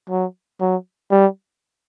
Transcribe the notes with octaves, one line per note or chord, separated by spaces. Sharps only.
F#3
F#3
G3